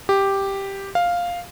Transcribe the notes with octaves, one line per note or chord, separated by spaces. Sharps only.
G4
F5